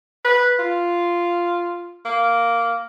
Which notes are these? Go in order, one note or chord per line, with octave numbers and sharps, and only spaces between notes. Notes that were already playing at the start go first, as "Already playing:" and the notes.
B4
F4
A#3